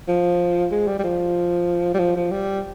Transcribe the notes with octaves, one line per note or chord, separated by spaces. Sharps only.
F3
G#3
G3
G3
F3
G3
F3
F3
G3